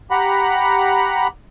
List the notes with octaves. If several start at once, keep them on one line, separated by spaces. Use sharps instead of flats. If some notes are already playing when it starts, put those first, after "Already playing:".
G4 F#5 A#5 B5